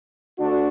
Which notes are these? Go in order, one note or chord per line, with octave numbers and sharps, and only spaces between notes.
D2 D3 D4 F#4